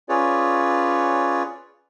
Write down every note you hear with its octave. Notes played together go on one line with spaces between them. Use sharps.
C#4 F4 G#4 B4 C#5 D5